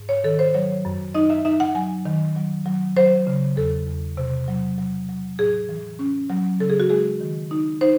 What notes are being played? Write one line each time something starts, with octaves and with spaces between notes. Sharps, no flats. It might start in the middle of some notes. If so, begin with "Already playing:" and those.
Already playing: G#2
C#5
D#3 A4
C5
F#3 C#5
F#2
D#4 D#5
E5
D#4 E5
F#5
F#3 G#5
D#3
F#3
F#3
F#3 C5
C#3
E2 A4
E2
C3
F#3
F#3
F#3
A2 G#4
E3
C#4
F#3
C#3 A4
G#4
F#4
G#3 G#4
D#3
D#4
D#4 C5